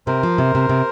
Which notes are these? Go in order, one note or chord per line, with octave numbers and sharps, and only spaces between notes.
C3 A#4 C5
F3
C3
C3
C3